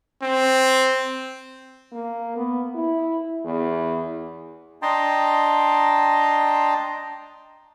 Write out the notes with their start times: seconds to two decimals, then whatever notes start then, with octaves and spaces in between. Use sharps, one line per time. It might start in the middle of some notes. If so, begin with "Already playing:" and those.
0.22 C4
1.92 A#3
2.37 B3
2.75 E4
3.45 E2
4.82 D4 D#5 G5 A5 A#5 C6